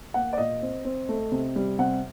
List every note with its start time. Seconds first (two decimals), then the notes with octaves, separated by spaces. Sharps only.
0.14 A#3 F#5
0.33 D5
0.38 A#2 D#5
0.62 C4
0.85 C4
1.09 A3
1.32 C3
1.56 G3
1.79 C3 F#5